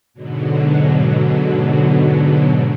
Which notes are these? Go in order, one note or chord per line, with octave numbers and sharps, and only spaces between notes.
G#2 B2 D3 F#3